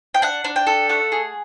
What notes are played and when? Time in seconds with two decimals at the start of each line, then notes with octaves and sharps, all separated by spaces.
0.14 G5
0.22 D4 F#5
0.44 D4
0.56 G5
0.67 A4
0.89 A3 F#5
1.12 G#4